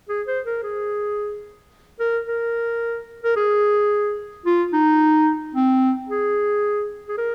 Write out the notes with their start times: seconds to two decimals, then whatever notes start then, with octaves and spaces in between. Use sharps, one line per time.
0.09 G#4
0.27 C5
0.45 A#4
0.63 G#4
2.00 A#4
2.27 A#4
3.24 A#4
3.36 G#4
4.45 F4
4.73 D#4
5.55 C4
6.09 G#4
7.08 G#4
7.18 A#4